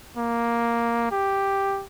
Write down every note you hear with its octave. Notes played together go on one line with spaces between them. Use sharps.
A#3
G4